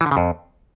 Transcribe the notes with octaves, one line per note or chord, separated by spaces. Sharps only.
E3
D3
C#3
F2